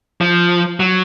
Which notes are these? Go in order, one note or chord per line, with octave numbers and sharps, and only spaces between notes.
F3
F#3